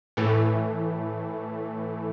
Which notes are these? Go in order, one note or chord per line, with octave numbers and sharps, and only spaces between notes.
A2 E3 A3